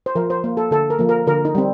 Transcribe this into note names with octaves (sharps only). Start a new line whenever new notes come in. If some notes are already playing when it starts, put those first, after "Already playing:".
C5
F3 A#4
C5
A#3
A4
D3 A4
A#4
F3 A#3
A#4
D3 A#4
D#4
G3 C4